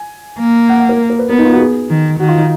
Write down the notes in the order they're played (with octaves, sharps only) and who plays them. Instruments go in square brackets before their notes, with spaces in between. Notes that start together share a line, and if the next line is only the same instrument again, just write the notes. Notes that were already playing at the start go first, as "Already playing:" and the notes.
Already playing: [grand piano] G#5
[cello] A#3
[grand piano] F#5
F#5
A#4
A#4
B4
[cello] B3 [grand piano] A#4
[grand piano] D#4
F4
F#4
G#4
[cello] D#3
[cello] D#3 [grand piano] F#4
[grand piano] F4
D#4